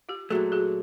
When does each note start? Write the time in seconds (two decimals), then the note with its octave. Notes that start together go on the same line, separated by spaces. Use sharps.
0.09 F4 G4
0.30 A#2 F#3 A3 F#4 G#4
0.52 F#4 G#4